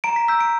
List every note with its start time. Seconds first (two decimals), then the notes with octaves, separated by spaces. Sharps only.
0.04 A#5 D7
0.16 B6
0.28 E6 G6 B6
0.40 D7